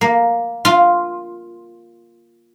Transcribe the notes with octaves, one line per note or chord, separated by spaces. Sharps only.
A#3
F4